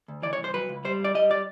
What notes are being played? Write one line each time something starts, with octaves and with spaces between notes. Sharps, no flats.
D2
E3 D5
C#5
C2
C5
F#3 B4
C#2
G3 C5
G2 D5
G3 D#5
D5